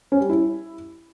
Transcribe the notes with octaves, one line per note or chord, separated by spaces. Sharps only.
C#4
G3
E4